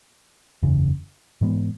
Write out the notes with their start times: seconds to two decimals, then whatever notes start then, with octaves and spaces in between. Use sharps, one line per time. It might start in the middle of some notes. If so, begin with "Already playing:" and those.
0.63 F#1 E2 C#3
1.41 G#2 E3 G#3 B3